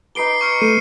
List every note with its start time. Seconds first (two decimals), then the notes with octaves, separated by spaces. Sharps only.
0.15 D#4 B4 D6 C7 D7 G7
0.41 C#6 F6 C#7
0.61 A3 C7 D#7